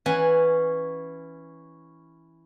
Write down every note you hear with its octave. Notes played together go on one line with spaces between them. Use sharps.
E3 C#4 F#5 G#5